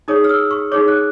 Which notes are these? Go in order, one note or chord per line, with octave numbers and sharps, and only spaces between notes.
D#4 G#4 C#5 D#6
F6
E6
C#6
D#4 G#4 C#5 D6
F#6